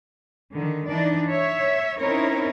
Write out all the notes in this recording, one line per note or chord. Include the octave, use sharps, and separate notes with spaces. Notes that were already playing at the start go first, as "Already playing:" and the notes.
D3 D#3
E3 D4 D#4 D5
C#5 E5
C4 C#4 D#4 E4 A#4 C#5